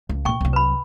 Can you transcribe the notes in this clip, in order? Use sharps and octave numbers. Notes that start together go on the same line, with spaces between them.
C#2
A#2 E3 G5 C#6
C2 F#3
B4 B5